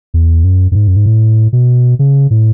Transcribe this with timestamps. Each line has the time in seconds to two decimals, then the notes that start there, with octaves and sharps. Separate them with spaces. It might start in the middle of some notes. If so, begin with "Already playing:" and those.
0.14 E2
0.44 F#2
0.72 F#2
0.75 G#2
0.88 F#2
0.96 G#2
1.06 A2
1.53 B2
1.99 C#3
2.31 A2